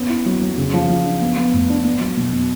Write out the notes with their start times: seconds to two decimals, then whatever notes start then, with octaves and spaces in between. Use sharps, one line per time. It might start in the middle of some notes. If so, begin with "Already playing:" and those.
Already playing: B3 C#4
0.09 E4
0.26 F#3
0.42 F#3
0.58 C#3
0.74 F3
0.89 F3
1.05 D4
1.21 B3
1.37 B3
1.54 A2
1.70 D4
1.84 B3
2.01 F#3
2.17 B2
2.33 B2